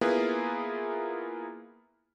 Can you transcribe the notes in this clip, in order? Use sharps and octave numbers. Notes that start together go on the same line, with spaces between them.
A#3 B3 E4 F4 G#4 B4